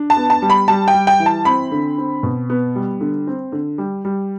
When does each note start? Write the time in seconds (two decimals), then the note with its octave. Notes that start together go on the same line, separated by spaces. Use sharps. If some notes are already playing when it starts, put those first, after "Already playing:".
Already playing: D4
0.10 A5
0.17 B3
0.30 A5
0.42 G3
0.50 B5
0.68 G3 A5
0.88 G5
0.94 G3
1.07 G5
1.20 E3
1.26 A5
1.45 C4 B5
1.71 D3
1.98 C4
2.23 B2
2.50 B3
2.76 G3
3.01 D3
3.27 C4
3.52 D3
3.78 G3
4.05 G3